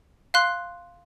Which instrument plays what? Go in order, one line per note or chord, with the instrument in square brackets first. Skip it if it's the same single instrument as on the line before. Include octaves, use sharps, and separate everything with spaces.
[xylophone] F5 C6 F#6